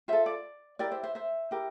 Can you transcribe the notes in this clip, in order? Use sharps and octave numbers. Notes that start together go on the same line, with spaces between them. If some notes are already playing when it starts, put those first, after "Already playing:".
F4 A4 C5 E5
D5
E4 G4 A#4 D5
C5 E5
C5 E5
C5 E5
E4 G4 A#4